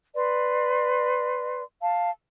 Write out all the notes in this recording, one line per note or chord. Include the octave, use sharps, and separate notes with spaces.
B4 D5 C6
F5 A5